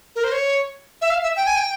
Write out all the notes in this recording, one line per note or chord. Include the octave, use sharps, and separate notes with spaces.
A#4
C5
C#5
E5
F5
E5
G5
G#5
G5